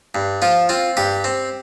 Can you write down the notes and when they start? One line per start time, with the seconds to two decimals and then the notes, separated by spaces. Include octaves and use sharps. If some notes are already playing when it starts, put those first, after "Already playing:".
0.15 G2
0.42 F3 F4
0.69 C4 F4
0.97 G2 G4
1.24 C4